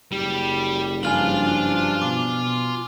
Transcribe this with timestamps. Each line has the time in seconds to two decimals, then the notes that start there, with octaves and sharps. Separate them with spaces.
0.12 F#1 G3
1.03 G2 F3 D4 F4 F5 G#5 F6 F#7
2.02 B2 D6